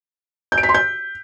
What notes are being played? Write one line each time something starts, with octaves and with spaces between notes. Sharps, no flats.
G6
D7
B6
C6
G6